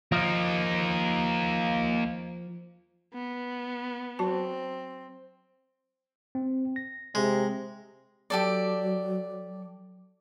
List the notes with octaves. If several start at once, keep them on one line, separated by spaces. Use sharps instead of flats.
F3 A#3 D#4
B3
F#3 C4 F#4 A5
C4
A#6
C3 G#3
F#3 G4 A4 D5